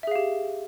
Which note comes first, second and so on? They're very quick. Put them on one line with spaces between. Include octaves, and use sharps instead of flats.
E5 G#4 F5 G4